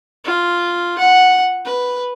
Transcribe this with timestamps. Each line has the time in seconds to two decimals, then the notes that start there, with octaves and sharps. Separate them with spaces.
0.24 F4
0.98 F#5
1.65 B4